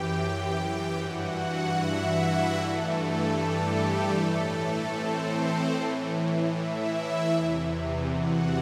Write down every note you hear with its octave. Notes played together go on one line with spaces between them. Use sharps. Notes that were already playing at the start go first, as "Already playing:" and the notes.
Already playing: F#2 E3 G4 G5
G2 E3 F#4 F#5
E4 E5
G2 E3 A3 A4
G3 G4
A2 E3 A3 A4
C4 C5
A2 E3
E4 E5
E2 C3 E3
F#4 F#5